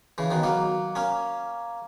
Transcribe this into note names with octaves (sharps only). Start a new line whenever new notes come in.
C#3 E3
B2 D#3
F#3 A#3
A#3 C#4